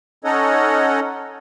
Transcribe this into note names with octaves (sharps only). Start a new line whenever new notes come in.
C#4 D#4 A4 C#5 D#5 F#5